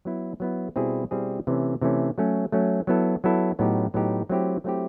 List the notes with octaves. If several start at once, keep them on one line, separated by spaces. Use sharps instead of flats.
F#3 B3 E4
F#3 B3 E4
B2 G3 C4 E4 G#4
B2 G3 C4 E4 G#4
C3 E3 A3 C#4
C3 E3 A3 C#4
F#3 A3 C#4
F#3 A3 C#4
F#3 B3 E4 A4
F#3 B3 E4 A4
A2 F#3 B3 D#4 G4
A2 F#3 B3 D#4 G4
F#3 A3 C4 E4 G4
F#3 A3 C4 E4 G4